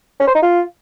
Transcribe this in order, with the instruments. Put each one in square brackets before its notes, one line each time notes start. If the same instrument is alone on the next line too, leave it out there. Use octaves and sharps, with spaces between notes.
[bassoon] C#4
C5
D#4
F4